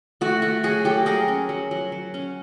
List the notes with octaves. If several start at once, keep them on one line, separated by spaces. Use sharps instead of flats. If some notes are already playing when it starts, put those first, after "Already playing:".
A3 F#4
A3 F#4
F#3 F#4 G#4
F#3 G4 A4
F#3 G#4 A#4
C#4
F#3
F#3
F#3
C#4